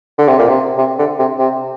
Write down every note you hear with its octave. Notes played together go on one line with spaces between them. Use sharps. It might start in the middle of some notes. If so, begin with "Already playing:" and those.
D3
C3
A#2
C3
C3
D3
C3
C3